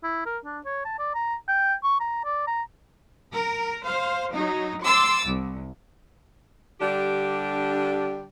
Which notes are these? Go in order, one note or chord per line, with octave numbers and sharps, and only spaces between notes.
E4
A#4
D4
C#5
A5
D5
A#5
G5
C#6
A#5
D5
A#5
A#4
C5 F5
F#3 D#4
C6 D6 E6 A6
C2
D3 G3 D4 G4